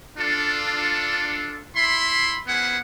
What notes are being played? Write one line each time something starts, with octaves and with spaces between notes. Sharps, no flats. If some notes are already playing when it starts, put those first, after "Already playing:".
D4 F4 A4
E4 E5 B5 C6
B3 C#4 E4 G#4 C5 F#5